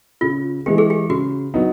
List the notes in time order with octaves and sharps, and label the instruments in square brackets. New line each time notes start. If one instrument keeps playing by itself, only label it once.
[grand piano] C#3 [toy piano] F4
[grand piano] E3 G#3 [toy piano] G4
[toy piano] G#4
G4
[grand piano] C#3 [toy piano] F#4
[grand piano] F#3 B3 D#4